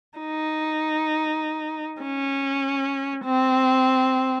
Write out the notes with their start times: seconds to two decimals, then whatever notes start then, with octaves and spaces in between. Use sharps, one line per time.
0.19 D#4
2.03 C#4
3.25 C4